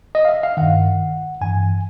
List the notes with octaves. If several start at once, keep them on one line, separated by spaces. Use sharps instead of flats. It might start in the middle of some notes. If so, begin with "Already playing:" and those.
D#5
F5
E5
F5
G2 D#3 F#5
G2 E3 G#5